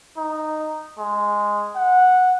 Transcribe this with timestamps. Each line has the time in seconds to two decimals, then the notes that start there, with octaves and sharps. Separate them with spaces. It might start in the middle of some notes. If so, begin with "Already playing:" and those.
0.18 D#4
0.99 G#3
1.76 F#5